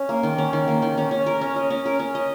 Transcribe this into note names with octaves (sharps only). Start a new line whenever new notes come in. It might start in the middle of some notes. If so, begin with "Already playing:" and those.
Already playing: C#4
A#3
D#3
C#4
D#3
A#3
D#3
C#4
C#4
A#4
C#4
D#5
C#4
A#4
C#4
D#5